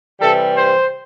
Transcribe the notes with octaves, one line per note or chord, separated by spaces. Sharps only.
C3 E3 G3 A4
C5